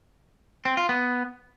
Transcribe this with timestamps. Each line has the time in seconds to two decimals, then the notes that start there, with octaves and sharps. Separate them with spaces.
0.65 C4
0.77 F4
0.89 B3